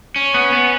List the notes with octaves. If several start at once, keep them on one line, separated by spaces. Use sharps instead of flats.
C#4
B3
B3